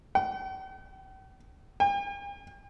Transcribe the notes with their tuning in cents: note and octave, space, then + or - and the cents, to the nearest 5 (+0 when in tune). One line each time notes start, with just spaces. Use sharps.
G5 -45
G5 +45